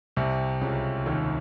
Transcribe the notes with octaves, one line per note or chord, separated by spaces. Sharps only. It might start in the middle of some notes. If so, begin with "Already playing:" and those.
C2 C3
C#2 C#3
D#2 D#3